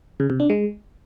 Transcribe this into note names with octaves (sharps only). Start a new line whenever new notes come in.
C#3
C3
D4
G#3